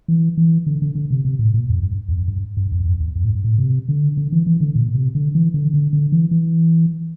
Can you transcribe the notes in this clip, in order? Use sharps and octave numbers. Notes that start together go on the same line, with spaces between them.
E3
E3
D3
D3
D3
C3
C3
A2
A#2
F2
G2
E2
F2
G2
G2
F2
F2
E2
F2
A2
G2
A2
C3
D3
D3
E3
E3
D3
A#2
C3
D3
E3
D3
D3
D3
E3
E3